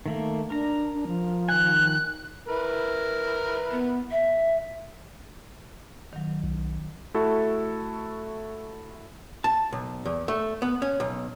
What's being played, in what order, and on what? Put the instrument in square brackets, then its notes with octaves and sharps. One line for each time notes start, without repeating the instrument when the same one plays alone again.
[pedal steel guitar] D#3 A3 A#3
[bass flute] D4 [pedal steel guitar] A#4 A#5
[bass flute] D4
F3
[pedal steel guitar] D#3 G#5 [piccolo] F#6
[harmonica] E4 A#4 B4
[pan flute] B3
E5
[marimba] D#3 F#3
[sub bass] B1
[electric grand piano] A3 E4 F#4 A4
[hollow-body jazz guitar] A5
B1
E2
A3
B3
C#4
B1